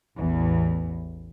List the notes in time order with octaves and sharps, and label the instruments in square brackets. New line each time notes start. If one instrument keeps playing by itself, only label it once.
[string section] A1 E2